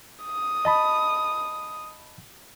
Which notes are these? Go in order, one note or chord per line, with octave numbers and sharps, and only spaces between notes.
D#6
D#5 A5 B5